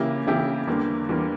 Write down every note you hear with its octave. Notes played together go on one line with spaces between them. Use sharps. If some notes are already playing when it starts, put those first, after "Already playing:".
Already playing: C#3 E3 A#3 E4 G4
C#3 E3 A#3 E4 G4
E2 D3 G3 A#3
E2 D3 G3 A#3